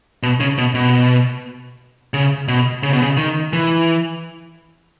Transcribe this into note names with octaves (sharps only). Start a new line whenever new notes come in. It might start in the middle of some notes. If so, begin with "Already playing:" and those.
B2
C#3
B2
B2
C#3
B2
C#3
B2
C#3
D#3
E3